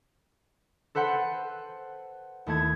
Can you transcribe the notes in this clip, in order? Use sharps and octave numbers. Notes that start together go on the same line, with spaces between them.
A4 B4 C5 F#5
D#2 A3 E4 G#6